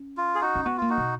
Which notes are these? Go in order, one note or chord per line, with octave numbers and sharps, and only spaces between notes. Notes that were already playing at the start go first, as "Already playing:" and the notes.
Already playing: C#4
F4
G#4
D#4 F#4
C#4
B3 F#4
A#3 F4
D#4 F#4
B2